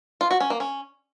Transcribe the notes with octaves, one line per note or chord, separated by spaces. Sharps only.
F4
F#4
C#4
A#3
C#4